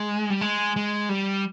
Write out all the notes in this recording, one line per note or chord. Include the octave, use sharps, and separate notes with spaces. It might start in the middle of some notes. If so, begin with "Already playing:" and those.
Already playing: G#3
G3
G#3
G#3
G3